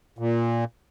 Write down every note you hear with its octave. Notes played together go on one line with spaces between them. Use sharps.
A#2